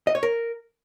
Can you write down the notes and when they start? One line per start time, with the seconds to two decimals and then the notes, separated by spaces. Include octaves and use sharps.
0.07 D#5
0.15 C#5
0.23 A#4